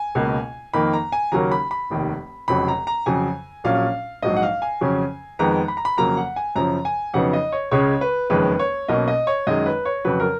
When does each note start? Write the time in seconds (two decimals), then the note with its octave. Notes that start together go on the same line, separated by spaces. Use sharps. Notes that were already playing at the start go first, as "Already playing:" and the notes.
Already playing: G#5
0.15 C#2 B2 A#3
0.73 F2 D#3 A#3 D#4 B5
0.93 A#5
1.12 G#5
1.32 D#2 C#3 F#3 A#3 C#4 A#5
1.52 B5
1.71 B5
1.90 F1 D#2 D#3
2.48 F1 F2 C#3 F#3 B5
2.68 A#5
2.87 A#5
3.06 F2 C#3 F#3 G#5
3.64 A#1 A#2 F#3 C#4 F5
4.22 A#1 G#2 F#3 D#5
4.37 F#5
4.43 F5
4.62 G#5
4.81 F2 C#3 F#3 C#4
5.39 F2 D#3 G#3 B3 A#5
5.68 B5
5.77 A#5
5.85 B5
5.97 F2 C#3 F#3 A#3 A#5
6.17 F#5
6.36 G#5
6.56 F#2 C#3 F3 A#5
6.85 G#5
7.14 F2 C#3 F#3 B3 D#4 F#5
7.33 D#5
7.52 C#5
7.71 C#2 C#3 G#3 C#4 C#5
8.01 B4
8.30 F#1 F2 D#3 G#3 C#4 B4
8.59 C#5
8.88 B1 B2 A#3 C#4 D#5
9.08 D#5
9.27 C#5
9.47 F#2 D#3 G#3 D#5
9.66 B4
9.85 C#5
10.05 F2 C#3 F#3 B4
10.20 A#4